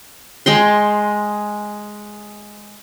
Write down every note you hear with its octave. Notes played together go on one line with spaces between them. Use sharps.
G#3 G5 C6